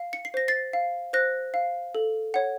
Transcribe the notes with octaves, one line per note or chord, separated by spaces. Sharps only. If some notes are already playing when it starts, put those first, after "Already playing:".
Already playing: F5
C#7
C7
C5 A#6
A6 C7
F5
C5 F#6 A#6
F5
A4
C#5 F#5